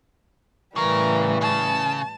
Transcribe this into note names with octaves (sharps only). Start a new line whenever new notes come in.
A2 C#3 E3 G3 A#4
C#3 A5